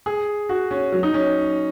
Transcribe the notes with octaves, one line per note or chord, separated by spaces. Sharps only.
G#4
F#4
C#4
F#3
D#4
C#4